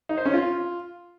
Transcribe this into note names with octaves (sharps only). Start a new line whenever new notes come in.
D#4
C5
C#4
F4